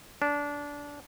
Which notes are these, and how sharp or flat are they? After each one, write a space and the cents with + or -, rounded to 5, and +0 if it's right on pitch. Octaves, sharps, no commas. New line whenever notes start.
D4 -20